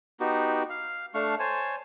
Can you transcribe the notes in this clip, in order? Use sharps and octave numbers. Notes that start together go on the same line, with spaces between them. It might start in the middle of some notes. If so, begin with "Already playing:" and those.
B3 D#4 F#4 G4
F5
A3 D4 F5 C#6
C5 C#5 G#5 A5